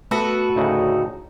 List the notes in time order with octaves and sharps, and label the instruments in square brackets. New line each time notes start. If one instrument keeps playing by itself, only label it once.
[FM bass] A3 [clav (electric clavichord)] B3 E5 A#5 [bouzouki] F#4 A4 B4
[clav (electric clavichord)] D2 A2 C#3 [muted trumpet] D#4